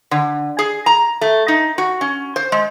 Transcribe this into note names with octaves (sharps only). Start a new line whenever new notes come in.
D3
G#4
A#5
A3
D#4
F#4
C#4
C5
G#3